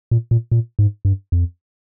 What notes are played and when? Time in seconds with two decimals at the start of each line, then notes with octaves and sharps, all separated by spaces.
0.11 A#2
0.31 A#2
0.51 A#2
0.79 G#2
1.05 G2
1.32 F2